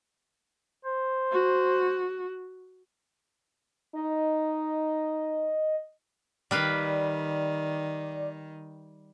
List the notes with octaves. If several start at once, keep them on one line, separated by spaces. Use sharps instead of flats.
C5
F#4
D#4 D#5
D#3 G3 B4 D5 F5